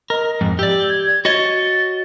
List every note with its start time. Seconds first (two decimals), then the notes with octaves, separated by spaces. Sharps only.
0.10 A#4 D#5
0.41 F2 G#2
0.59 G4 D5 E6
0.89 G#6
1.25 F#4 C#5 D#5 A6